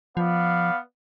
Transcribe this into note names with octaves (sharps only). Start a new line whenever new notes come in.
F3 B3 D5 F5